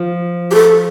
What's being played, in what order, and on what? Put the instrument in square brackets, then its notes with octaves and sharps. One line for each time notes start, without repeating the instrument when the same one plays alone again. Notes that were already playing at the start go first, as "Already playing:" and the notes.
Already playing: [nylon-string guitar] F3
[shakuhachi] G4
A4